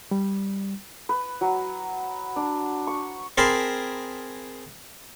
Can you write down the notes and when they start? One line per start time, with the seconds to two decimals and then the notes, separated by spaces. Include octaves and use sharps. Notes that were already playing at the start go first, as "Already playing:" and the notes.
0.11 G3
1.09 B4
1.41 F#3
2.36 D4
2.87 C#6
3.37 C4 G#4 A#4 A5 B5 C6